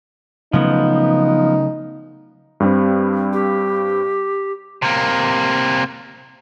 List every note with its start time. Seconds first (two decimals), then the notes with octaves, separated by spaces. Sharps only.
0.53 C#3 F3 F#3 A3 B3 D#4
2.60 G2 G3 C4
3.33 G4
4.82 C3 A#3